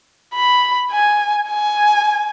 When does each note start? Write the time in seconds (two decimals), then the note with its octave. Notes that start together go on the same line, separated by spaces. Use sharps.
0.34 B5
0.92 G#5
1.49 G#5